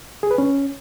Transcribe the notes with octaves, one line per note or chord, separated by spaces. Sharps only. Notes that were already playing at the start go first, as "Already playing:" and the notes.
G#4
B4
C#4